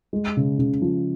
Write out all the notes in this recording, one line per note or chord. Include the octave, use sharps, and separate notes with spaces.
G#3
C#3
C#3
F3